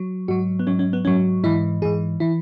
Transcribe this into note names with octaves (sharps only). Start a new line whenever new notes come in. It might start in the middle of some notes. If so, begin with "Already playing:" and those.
Already playing: F#3
G#2 F#3 F#4
B3
G#2 F#3 C#4
C#4
B3
G#2 F#3 C#4
G#2 E3 E4
G#2 E3 G#4
E3 E4